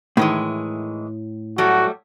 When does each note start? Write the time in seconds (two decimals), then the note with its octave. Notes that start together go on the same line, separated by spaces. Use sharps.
0.17 A2 D#3 E3 G#3
1.58 F#3 G3 A3 F#4